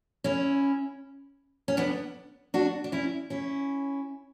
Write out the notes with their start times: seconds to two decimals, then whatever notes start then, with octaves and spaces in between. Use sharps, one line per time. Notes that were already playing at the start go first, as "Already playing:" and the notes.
0.24 C#4 E4
1.68 C#4
1.77 B3 D4
2.54 D4 F#4
2.84 D4
2.92 C#4 E4
3.30 C#4 E4